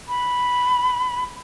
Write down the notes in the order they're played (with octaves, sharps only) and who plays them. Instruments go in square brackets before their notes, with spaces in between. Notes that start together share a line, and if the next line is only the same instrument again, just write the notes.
[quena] B5